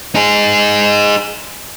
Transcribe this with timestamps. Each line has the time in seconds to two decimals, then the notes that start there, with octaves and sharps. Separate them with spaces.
0.15 D#4 G#4